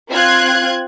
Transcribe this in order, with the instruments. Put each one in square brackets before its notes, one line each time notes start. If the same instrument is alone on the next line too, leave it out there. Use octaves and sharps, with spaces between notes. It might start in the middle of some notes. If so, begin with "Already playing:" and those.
[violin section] C4 F4 F#6 G#6